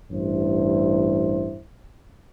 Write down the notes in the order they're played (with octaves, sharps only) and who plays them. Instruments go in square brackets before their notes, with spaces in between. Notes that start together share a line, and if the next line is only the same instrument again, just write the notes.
[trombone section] A1 G2 E4 C5